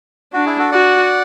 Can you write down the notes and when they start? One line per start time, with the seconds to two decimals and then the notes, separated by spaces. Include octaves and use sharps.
0.33 D4 F#4
0.46 E4 G#4
0.58 F#4 A4
0.72 F#4 D5 F#5